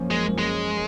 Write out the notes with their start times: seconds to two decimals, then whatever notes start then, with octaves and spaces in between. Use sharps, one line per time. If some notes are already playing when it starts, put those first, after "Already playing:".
Already playing: F#2 F3 A#3 C#4
0.11 G#3
0.38 G#3